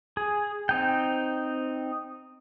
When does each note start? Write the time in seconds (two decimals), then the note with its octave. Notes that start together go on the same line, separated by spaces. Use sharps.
0.17 G#4
0.69 C4 D#4 G5